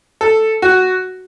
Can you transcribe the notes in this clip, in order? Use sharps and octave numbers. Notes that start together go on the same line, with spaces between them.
A4
F#4